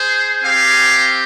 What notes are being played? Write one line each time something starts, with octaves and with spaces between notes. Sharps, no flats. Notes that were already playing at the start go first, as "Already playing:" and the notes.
Already playing: G#4 C5
C4 G4 F5 G#5